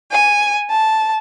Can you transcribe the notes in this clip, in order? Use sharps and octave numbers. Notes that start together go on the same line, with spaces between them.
G#5
A5